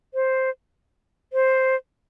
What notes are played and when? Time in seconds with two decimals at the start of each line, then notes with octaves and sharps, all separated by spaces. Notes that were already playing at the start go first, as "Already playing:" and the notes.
0.14 C5
1.33 C5